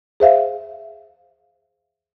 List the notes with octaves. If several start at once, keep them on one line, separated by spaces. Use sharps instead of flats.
G#4 C5 E5 F5